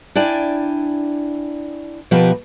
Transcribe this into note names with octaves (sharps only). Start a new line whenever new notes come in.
D4 E4 D5 G5 G#5
B2 F3 G4 A#4 B4